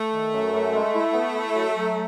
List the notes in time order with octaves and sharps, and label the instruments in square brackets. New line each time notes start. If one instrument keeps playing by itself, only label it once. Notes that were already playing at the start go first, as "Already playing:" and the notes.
Already playing: [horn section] A3
[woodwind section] D#3
F#2
F#2
G#3
E4
B3
E4
F#3
F#3